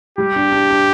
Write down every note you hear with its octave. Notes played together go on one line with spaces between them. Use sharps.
G3 G4
D4
D4
D4